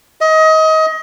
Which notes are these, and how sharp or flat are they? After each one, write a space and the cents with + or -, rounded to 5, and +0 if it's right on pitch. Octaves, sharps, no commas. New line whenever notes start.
D#5 +25